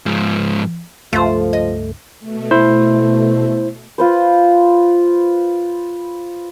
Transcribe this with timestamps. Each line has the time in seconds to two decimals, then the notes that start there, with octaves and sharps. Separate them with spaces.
0.06 G#2 F3
1.13 C#2 G2 F3 A3 F4 C5
1.53 D#5
2.20 B2 A3
2.51 E4 C5
3.98 F4 B4 C5